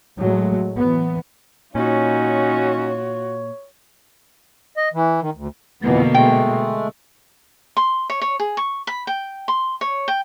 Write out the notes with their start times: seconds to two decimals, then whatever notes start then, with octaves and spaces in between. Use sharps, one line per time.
0.18 A2 F#3 G#3 A3
0.77 E3 B3
1.75 A#2 C#4 D#4 F4 F#4 C#5
4.77 D#5
4.94 E3
5.21 D#3
5.35 D2
5.82 F2 B2 D3 E3 A#3 B3
6.14 G#3 A3 G5
7.77 C6
8.10 C#5
8.22 C#5
8.40 G#4
8.57 C#6
8.87 B5
9.07 G5
9.48 C6
9.81 C#5
10.08 G5